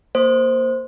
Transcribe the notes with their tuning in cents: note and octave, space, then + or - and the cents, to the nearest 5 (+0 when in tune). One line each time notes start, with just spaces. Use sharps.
A#3 +0 C5 +0